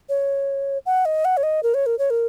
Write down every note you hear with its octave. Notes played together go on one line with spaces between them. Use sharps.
C#5
F#5
D#5
F#5
C#5
D#5
A#4
C#5
A#4
C#5
A#4